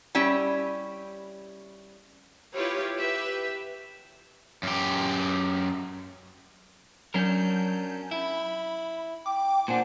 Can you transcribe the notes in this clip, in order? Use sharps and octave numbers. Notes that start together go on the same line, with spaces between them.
G3 C#4 E4 G5
E4 F4 G4 B4 C#5
G4 B4 E5
F#2 G4
F#3 C#4 D4 A#4 G6
E4 B5
G5 D6
A#2 D4 C5 F#5 G#5